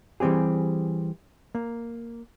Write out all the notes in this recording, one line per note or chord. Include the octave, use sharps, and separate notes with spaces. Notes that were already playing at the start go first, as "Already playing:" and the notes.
E3 G3 C4 G4 G#4
A#3